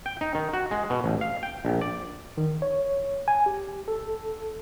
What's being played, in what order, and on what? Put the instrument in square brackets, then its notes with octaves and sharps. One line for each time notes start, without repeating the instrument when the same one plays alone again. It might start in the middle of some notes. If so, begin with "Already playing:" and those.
[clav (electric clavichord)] G5
D#4
D#3
F#4
G#3
B2
A1
F5
G5
A#1
D5
[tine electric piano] D#3
C#5
G#5
G4
A4